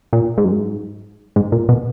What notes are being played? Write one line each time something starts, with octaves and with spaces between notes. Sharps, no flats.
A#2
G#2
F#2
G#2
G#2
A#2
B2